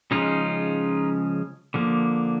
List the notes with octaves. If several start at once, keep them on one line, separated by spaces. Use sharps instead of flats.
C#3 F3 G#3 C#4 D#4 F4
D3 F3 A#3